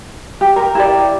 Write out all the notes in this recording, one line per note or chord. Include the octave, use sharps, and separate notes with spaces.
G4
A#4
E4 G4 D5